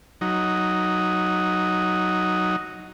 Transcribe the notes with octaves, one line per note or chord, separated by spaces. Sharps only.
F#3 D#4